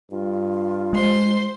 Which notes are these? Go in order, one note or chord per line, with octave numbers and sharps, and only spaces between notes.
G2 F4
G#3 C5 C6